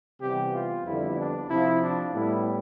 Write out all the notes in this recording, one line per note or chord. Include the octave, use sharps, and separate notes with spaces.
C3 E3 G3 B3 G4
F4
F2 D3 G3 B3 E4
D4
C3 F3 C4 E4
D4
A2 G3 B3 E4